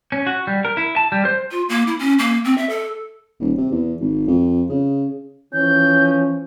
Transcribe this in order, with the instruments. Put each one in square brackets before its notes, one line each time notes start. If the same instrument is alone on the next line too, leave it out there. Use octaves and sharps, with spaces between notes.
[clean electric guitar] C#4
F#4
G3
A#4
E4
A5
G3
C5
[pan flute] F4
A#3
E4
C#4
A#3
C4
E5
A4
[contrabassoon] D#1
C3
E2
G#1
F2
C#3
[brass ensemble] E3 F3 C#4 [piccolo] G6